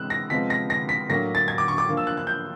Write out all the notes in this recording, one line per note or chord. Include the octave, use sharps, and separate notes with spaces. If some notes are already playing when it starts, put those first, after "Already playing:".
Already playing: C3 E3 G#3 E6 F#6
A#6
C3 F3 G#3 B3 B6
A#6
A#6
B6
A2 F#3 A#3 D4 A#6
A6
G#6
D6
C#6
D6
F3 A#3 D4
E6
F#6
F#6
G6